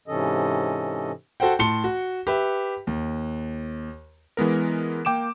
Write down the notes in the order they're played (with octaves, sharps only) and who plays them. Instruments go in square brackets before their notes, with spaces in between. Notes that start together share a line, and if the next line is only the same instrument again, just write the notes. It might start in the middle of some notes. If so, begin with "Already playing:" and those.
[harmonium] G#2 C3 E3 C#4 A4 D#5
[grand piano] F#4 A4 C5 F#5 G5
A2 A5 C6 C#7 G7
F#4
G4 B4 E5
D#2
[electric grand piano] E3 G#3 B3 A#4
A#3 G5 D6 D7 E7